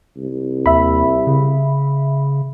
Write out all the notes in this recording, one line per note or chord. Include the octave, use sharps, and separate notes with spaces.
C2
D#2 E5 B5
C#3